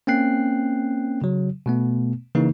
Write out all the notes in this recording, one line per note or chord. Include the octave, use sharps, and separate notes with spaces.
A#3 C4 C#4 G5 F#6 C7
C#3 F#3
B2 A3 B3
C#3 E3 A#3 D#4